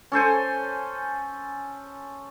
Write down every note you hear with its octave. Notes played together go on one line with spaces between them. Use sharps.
C#4 A4 C5 G#5